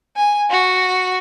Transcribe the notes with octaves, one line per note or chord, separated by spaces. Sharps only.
G#5
F#4